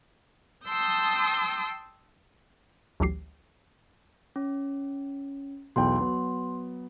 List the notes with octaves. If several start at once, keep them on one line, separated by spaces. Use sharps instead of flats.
G5 A5 C6 D#6 E6 G6
A1 D2 F#3 G4 C7
C#4
B1 E2 G5 C6
F#3 B3